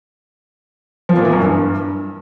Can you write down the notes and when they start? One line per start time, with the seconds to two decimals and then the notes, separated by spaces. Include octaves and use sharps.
1.09 F3
1.17 A#2
1.25 E3
1.32 F#2
1.40 G2